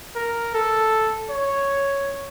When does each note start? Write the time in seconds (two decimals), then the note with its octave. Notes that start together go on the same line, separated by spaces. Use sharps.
0.16 A#4
0.55 A4
1.30 C#5